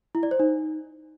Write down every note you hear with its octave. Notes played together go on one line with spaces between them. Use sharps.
E4
D5
C5
D#4